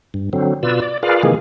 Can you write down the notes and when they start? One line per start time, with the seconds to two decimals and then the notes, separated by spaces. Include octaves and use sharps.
0.14 G2
0.33 D3 F#3 C4
0.63 B2 F4 B4 D5 E6
0.82 D5
1.03 F4 G#4 A#4 B4 D5 F5
1.23 C3 D#3 E3 G#3 A#3 G#4